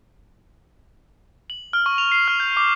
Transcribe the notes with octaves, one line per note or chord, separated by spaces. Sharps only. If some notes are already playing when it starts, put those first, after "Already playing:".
F#7
F6
C#6
F7
C7
F6
G6
D6